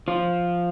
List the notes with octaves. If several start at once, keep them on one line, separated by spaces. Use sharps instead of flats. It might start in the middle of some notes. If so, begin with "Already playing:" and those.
F3 F4